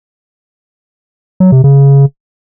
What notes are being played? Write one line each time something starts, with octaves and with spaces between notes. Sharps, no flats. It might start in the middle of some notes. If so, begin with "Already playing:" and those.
F#3
C3
C#3